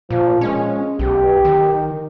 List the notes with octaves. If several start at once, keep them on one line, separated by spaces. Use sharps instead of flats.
A#2 F3
G#3 C#4
B1 G4
D#3